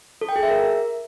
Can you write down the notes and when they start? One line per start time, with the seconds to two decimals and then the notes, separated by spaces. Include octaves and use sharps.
0.21 A4
0.29 G5
0.36 G#4
0.43 E5
0.50 A#4